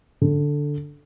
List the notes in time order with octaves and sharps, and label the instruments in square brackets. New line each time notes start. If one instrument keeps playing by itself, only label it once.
[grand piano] D3